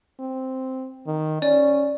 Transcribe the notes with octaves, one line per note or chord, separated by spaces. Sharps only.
C4
D#3
C#4 D5